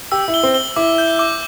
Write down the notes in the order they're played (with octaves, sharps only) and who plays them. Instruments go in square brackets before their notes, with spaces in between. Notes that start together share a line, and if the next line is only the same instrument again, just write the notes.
[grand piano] G4 [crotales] E6
[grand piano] E4
[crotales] G7
[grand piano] C4
[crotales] G7
[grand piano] E4 [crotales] D6
[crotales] G6
D6